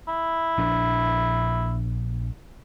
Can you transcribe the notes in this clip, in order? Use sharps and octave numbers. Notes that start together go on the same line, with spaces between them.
E4
A#1 D4